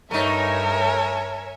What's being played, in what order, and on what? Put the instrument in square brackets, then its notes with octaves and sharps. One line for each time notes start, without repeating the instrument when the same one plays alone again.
[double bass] G2 [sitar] A3 D#4 [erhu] A#4 [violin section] C#5 E5 G#5